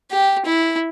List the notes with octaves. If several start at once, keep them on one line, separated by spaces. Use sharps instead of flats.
G4
E4